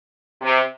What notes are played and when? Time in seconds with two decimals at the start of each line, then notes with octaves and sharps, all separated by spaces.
0.42 C3